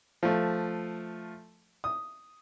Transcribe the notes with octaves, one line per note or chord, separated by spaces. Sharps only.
F3 A3
D#6